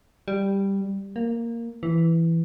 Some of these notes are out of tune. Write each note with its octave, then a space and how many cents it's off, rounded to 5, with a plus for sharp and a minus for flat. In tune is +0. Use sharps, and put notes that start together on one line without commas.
G3 +5
A#3 -5
E3 +5